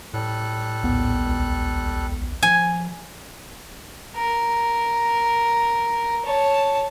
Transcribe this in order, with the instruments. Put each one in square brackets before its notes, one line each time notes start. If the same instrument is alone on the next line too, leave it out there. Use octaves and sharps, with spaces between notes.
[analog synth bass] A2 [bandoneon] G3 A4 F#6
[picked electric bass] A#1 D#2 B3
[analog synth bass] C#2
[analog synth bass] F3 [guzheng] G#5
[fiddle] A#4
C#5 A5